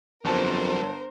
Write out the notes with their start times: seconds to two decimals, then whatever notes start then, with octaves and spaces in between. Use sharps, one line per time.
0.25 G1 F2 F#3 G3 A#4 C5 A5